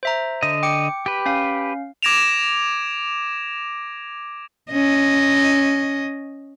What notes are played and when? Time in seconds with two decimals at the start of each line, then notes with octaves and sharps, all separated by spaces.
0.03 C5 E5 A#5
0.43 D3 D#5
0.63 G5 D6 C#7
1.06 G4 B4
1.26 C#4 F5
2.03 D6 G#6 A#6 D7 E7 F7
4.72 C#4 D#5